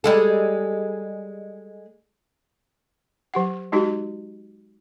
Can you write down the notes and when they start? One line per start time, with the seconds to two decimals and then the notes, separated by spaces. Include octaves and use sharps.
0.04 G3 G#3 A4
3.34 F#3 G4 F#5
3.72 G#3 D#4 F#4 G4